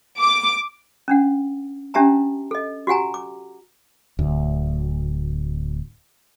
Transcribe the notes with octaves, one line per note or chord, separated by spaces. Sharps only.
D6
C#4 D4 F#5
C#4 D4 G4 E5 A5 A#5
A4 D#5
F#4 G4 F#5 G#5 A#5
D6
D1 D2